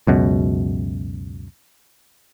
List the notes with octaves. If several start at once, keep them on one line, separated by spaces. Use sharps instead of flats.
C#2 F#2 B2